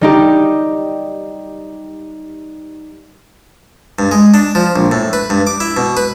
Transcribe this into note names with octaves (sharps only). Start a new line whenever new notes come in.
G3 D#4 G4
G2
G#3
D4
F3
A#1
A2
B4
G2
D6
E4
B2
B4